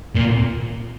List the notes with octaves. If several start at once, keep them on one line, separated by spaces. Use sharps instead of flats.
A#2